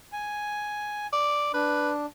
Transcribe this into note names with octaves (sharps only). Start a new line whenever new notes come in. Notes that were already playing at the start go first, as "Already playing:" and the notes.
G#5
D5
D4 B4